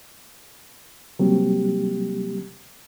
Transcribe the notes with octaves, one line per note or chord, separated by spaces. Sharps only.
C3 F#3 G3 A#3 C4 G4